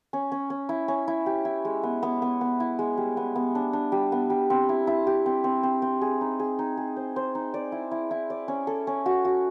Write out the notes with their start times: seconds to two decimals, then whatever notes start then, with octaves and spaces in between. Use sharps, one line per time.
0.13 C#4
0.32 C#4
0.50 C#4
0.69 E4
0.88 C#4
1.08 E4
1.26 G4
1.45 E4
1.65 G#3
1.83 B3
2.03 B3
2.22 B3
2.41 B3
2.60 E4
2.79 G#3
2.97 G3
3.17 B3
3.36 B3
3.55 D4
3.73 D4
3.92 G3
4.12 B3
4.30 G3
4.50 C4
4.69 E4
4.87 E4
5.07 G4
5.26 C4
5.44 C4
5.63 C4
5.82 C4
6.01 G#4
6.21 D#4
6.39 G#4
6.59 D#4
6.77 G#4
6.96 C5
7.16 C5
7.35 D#4
7.54 D5
7.72 E4
7.91 E4
8.11 E4
8.30 D5
8.48 C#4
8.67 A4
8.87 C#4
9.06 F#4
9.25 F#4